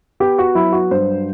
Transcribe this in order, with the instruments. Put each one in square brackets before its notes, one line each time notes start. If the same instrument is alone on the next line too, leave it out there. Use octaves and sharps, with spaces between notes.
[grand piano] B3 G4
F#4
F#3 E4
F#4
G2 C5